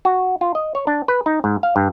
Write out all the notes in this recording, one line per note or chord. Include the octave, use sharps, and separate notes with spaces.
F#4
F4
D#5
C#5
D4
B4
D#4
G#2
F5
G2